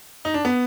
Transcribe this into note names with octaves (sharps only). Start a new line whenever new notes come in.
D#4
D4
B3